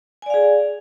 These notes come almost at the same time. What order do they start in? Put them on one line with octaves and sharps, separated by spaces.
G#5 D5 F5 G#4